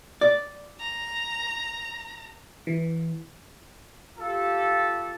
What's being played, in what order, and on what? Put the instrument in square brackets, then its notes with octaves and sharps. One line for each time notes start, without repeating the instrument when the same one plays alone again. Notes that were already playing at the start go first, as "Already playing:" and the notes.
[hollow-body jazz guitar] D5
[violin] A#5
[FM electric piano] E3
[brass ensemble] F4 G4 A4